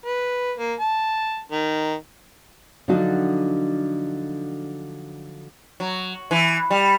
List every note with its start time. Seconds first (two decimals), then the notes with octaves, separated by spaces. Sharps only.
0.06 B4
0.58 A#3
0.80 A5
1.52 D#3
2.88 D3 F3 F#3 D4 D#4 F#4
5.80 F#3
6.31 E3
6.70 G3